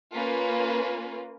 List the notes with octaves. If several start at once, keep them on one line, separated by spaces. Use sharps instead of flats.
A#3 C#4 F4 B4